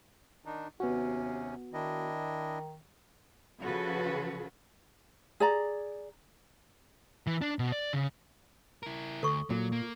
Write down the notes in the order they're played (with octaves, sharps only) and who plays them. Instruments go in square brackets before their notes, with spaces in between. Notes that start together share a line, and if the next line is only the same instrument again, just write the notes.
[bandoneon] D#3 D4 D#4
[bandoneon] D#2 C3 C#4 [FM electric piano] B3 F#4
[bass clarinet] D#3 [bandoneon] D4 E4 D#5
[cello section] C#3 F3 F#4 A4 B4
[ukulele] G#4 D5 A#5
[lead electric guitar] E3
D4
B2
D5
C#3
E4 A#4
[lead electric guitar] D2 [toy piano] A4 C#6
[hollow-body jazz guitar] A#2 [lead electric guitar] F#3
[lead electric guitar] A#3